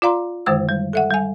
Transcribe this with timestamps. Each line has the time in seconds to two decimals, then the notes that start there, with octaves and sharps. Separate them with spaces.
0.02 F4 D5 F5 A#5 C6
0.46 F#2 D3 D#3 G#3 C5 E6
0.69 G3
0.93 A4 E5 F#5
1.10 G3 G#5